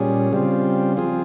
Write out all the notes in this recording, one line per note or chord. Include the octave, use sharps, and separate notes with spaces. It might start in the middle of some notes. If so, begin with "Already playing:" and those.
Already playing: A#2 G3 C#4 G#4
C#3 G3 C4 F4
F3 C4 F4 G#4